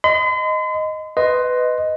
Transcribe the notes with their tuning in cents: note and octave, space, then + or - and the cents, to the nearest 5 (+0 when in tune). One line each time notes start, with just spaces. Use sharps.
D#5 +0 C6 -45
B4 +15 D#5 +0 C6 +0